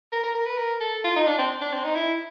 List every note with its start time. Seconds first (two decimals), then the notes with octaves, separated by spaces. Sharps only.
0.12 A#4
0.23 A#4
0.35 A#4
0.46 B4
0.57 A#4
0.80 A4
1.04 F4
1.16 D#4
1.27 D4
1.38 C4
1.61 D4
1.73 C4
1.84 D#4
1.95 E4